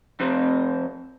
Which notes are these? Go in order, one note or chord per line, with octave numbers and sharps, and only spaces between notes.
F2 C3 C4